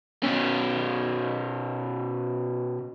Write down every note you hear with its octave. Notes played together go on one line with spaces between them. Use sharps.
B2 C#4